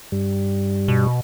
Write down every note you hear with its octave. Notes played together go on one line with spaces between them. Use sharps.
G2 G3
B2